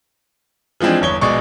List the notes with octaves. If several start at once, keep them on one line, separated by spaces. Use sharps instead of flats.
E3 F3 G#3 C4 D4
G1 E2 C#5 G7
A#1 B2 G#3 D5 C#6